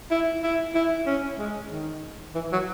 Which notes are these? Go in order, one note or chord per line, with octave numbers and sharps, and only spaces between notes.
E4
E4
E4
C#4
G#3
D#3
E3
F#3